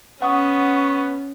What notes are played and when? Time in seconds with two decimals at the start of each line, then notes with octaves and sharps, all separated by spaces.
0.22 B3 C#4 F#5 C#6 D#6